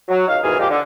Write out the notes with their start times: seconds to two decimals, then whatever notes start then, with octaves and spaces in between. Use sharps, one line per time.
0.09 F#3
0.28 C#2 D#4 C#5 F5
0.43 D#2 G#2 B2 E3 G#4 F6
0.59 A#2 F3 G#3 F4 G4
0.70 D3